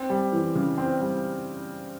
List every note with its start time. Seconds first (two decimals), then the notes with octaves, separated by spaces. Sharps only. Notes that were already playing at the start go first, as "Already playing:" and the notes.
Already playing: C4
0.10 G3
0.32 E3
0.55 C#3
0.78 C4
1.01 G3